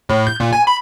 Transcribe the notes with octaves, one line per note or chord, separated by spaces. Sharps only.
A2
G6
A#2
G#5
B5